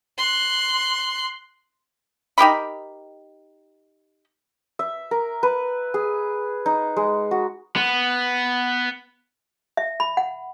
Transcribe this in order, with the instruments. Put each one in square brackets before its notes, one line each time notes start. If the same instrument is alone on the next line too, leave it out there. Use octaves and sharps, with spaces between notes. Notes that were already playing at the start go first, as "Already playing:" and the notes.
[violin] C6 F#6
[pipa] D#4 G4 A#4 B5
[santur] E5
A#4
B4
G#4
D#4
G#3
F#4
[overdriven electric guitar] B3
[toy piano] E5
B5
F#5